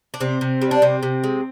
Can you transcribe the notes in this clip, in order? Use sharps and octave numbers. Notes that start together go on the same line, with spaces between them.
D4
C3 C4
C3
G3
D4
C3 C4
C3
G#3